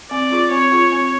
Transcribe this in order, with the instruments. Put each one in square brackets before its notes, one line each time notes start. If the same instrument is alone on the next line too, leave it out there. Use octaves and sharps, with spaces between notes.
[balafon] C4 [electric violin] D5
[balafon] F4 G#4
[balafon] C4 [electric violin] C#5
[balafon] F4 G#4
C4